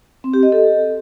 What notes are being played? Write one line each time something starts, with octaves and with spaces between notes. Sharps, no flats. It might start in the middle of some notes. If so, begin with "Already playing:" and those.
C4
G4
D#5
A4